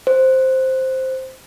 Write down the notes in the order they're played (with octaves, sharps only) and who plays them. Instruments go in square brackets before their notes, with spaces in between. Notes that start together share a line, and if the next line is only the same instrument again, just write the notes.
[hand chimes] C5